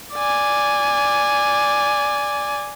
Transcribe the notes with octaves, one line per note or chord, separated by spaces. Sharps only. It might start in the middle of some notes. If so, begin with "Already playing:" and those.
D5 G#5